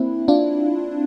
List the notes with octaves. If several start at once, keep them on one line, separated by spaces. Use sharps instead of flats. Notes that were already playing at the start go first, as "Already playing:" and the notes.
Already playing: A#3 C4 D4 E4
D4 F4